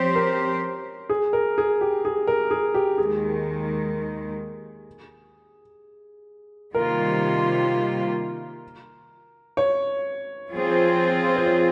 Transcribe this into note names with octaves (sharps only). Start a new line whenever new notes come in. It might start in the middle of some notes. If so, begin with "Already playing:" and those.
Already playing: F3 C4 G4 C5 C#5
A#4
G#4
A#4
G#4
G4
G#4
A#4
G#4
G4
D#2 D#3 G#3 G#4
C3 D#3 G3 A#3 F4 A#4
C#5
F3 C4 F4 G#4
C5
C#5